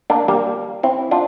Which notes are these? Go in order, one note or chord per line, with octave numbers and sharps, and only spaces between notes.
A#3 D4
G3 A#3
C4 E4
D4 F4